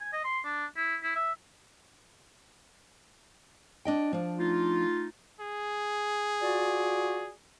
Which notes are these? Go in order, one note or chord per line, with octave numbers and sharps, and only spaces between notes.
G#5
D#5
C6
D4
E4
E4
E5
D4 D#5 G5
F3 D4
A3 D#4 F4
G#4
F4 F#4 D5